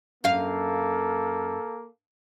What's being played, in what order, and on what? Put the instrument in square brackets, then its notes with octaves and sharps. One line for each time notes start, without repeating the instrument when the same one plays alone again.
[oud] F#2 F5 [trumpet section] A#3 A4